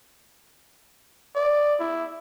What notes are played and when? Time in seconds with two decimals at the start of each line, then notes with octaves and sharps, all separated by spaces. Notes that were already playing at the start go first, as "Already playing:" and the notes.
1.36 D5
1.80 E4